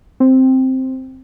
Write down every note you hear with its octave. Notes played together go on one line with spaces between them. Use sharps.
C4